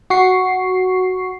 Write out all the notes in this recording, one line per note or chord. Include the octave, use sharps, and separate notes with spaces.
F#4 C#6 C7